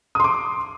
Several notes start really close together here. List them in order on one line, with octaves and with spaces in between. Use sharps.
D#6 C6 D6